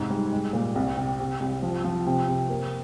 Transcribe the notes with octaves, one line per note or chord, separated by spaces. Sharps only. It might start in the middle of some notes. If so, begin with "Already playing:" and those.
Already playing: G#2 C3
G3
G#3
A#2
C2
C3
C3
C2
F3
F3
C3
C3
A#3